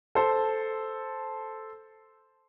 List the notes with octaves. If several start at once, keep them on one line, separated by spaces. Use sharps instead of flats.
A4 C5